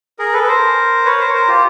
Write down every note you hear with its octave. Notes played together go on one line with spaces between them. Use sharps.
G#4 A#4
A4 B4
B4
A#4 C5
B4 C#5
A#4 C5
C#5
A#4 C5
F4 G4